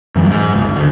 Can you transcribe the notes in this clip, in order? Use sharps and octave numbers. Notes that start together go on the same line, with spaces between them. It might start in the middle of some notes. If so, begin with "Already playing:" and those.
F#2 E3 F#3 G3
G#2
G1 C#2
D2